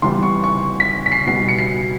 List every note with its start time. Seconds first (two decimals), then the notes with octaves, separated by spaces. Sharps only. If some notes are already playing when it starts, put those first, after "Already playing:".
0.02 E3 G3 B3 C6
0.23 C#6
0.44 C#6
0.80 B6
1.06 B6
1.12 C7
1.27 B2 G3 B3 C7
1.48 C#7
1.59 C7